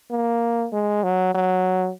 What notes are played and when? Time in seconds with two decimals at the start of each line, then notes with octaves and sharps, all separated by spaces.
0.10 A#3
0.73 G#3
1.03 F#3
1.34 F#3